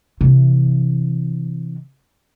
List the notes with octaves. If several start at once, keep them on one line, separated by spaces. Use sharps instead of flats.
C3 E3